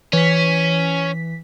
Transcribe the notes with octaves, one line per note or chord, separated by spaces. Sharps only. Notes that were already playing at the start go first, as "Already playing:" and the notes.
E3 C#4 B6